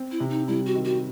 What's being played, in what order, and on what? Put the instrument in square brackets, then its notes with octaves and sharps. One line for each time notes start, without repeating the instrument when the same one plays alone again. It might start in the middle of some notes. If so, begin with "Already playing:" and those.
Already playing: [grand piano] C4
[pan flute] E4
[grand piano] C3
[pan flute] D#4
[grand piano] G3 [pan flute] E4
[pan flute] F#4
[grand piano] D#3
[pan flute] F#4